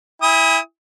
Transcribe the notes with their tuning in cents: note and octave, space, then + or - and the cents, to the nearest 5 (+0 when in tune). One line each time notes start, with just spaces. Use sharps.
E4 -5 G#5 -45 D#6 +25